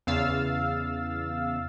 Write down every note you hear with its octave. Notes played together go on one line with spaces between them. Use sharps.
E2 C#3 F5 E6 A6